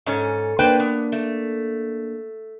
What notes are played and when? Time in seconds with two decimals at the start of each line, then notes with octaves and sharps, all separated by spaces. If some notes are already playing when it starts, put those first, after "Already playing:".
0.06 G#2 C#4 A4
0.59 A#3 D4 B4 C5 G5
0.80 B3
1.12 A3